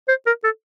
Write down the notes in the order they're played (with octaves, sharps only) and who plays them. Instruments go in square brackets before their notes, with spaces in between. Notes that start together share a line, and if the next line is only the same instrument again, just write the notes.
[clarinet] C5
A#4
A4